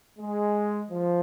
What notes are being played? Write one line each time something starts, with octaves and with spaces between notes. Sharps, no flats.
G#3
F3